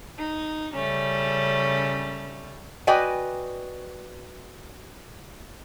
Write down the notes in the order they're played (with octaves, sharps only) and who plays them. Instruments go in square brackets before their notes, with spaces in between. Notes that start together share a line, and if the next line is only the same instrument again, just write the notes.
[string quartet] D#4
C#3 G3 A3 C#4
[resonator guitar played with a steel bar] F#4 B4 D5 D#5 G5 G#5